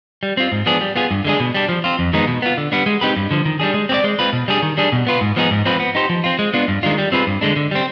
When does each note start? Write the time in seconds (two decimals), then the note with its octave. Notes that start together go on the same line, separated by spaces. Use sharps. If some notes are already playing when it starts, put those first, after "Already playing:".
0.23 G3
0.37 C4 F4
0.52 G#2
0.66 F3 B3 D4 G#4
0.81 G3
0.96 B3 F4 G#4
1.11 G2
1.25 D3 G#3 D4 G#4
1.40 B2
1.55 G3 D4
1.69 F3
1.84 C4 F4
1.99 F2
2.13 D#3 G#3 B3 D#4
2.27 B2
2.42 B3 F4
2.58 D3
2.72 G3 B3 D4
2.86 G#3
3.01 C4 D#4 G4 B4
3.16 G2
3.31 D3 F3
3.45 D#3
3.60 G3 D4 G#4
3.74 G#3
3.89 C4 G4 D5
4.04 G#3
4.19 C4 F4 B4
4.33 B2
4.48 G3 D4 G#4
4.62 D#3
4.78 G3 D4 G#4
4.92 B2
5.07 B3 F4 B4
5.21 G#2
5.36 F3 B3 D#4 G#4
5.51 G#2
5.66 F3 C4 F4 B4
5.80 B3
5.95 D#4 G4 C5
6.10 F3
6.24 C4 F4
6.39 G#3
6.54 B3 D4 F4
6.68 G2
6.83 D#3 G#3 D4 F4
6.98 G3
7.12 C4 F4 G#4 B4
7.27 G2
7.41 D3 G#3 D4
7.56 D3
7.71 G3 C4